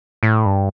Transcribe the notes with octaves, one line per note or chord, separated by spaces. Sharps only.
A2
G2